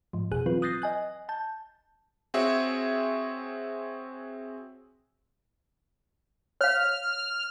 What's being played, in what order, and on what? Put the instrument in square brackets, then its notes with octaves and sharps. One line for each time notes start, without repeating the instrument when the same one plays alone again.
[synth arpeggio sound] G#2 F3
A1 F2 B2 G#4 F#6
E3 F#3 C4 F4 B4
D#6 F#6 G6 A6 A#6 C7
D#5 G#5 F#6
A5 G6
[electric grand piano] C4 F#4 G#4 C#5 E5
[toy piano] C#5 F5 [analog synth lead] F6